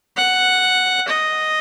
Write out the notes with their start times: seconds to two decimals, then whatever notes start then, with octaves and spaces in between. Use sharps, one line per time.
0.17 F#5
1.09 D#5